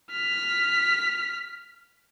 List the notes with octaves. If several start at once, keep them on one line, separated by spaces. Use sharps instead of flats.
F6 B6